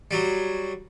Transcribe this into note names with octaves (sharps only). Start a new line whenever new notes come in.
F#3 G3